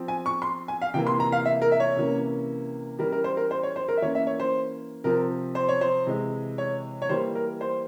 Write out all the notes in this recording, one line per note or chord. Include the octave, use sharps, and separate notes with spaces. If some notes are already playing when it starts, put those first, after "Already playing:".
Already playing: F3 C4
G#5
C#6
C6
G#5
F5
C3 E3 A#3 G5
C6
A#5
F5
E5
A#4
E5
C#5
C3 E3 A#3 C#4
E3 G3 C#4 A#4
A#4
C5
A#4
C5
C#5
C5
A#4
E5
E3 A#3 C#4 C#5
E5
C#5
C5
C3 F3 C4 A#4
C5
C#5
C5
C3 E3 G#3
C#5
C#5
E3 G3 A#3 C5
A#4
C5